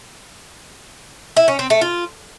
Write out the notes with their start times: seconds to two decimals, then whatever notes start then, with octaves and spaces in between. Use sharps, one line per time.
1.37 E4
1.48 C#4
1.59 C4
1.70 A3
1.81 F4